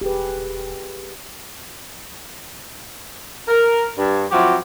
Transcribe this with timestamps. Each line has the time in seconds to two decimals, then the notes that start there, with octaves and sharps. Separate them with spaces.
0.01 E1 G4 G#4 B4
3.48 A#4
3.97 G2
4.31 F3 F#3 C4 E4 F#4 G4